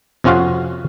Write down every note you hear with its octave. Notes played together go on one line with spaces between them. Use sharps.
F2 C3 C#4 F4 F#4 F5